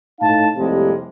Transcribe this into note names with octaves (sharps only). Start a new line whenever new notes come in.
A2 D#4 F5 A5
F2 A2 C3 G3 G#3 A#3